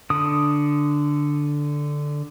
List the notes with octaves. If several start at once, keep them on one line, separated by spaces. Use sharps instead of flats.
D3 D#6